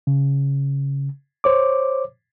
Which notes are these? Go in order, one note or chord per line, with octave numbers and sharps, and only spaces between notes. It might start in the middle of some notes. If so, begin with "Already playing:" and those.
C#3
C5 C#5 D6